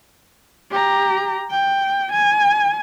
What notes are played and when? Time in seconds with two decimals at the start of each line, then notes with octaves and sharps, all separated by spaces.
0.71 G4 A#5
1.51 G5
2.12 G#5